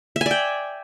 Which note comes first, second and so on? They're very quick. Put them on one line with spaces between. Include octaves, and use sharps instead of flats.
E5 G#5 D5 G5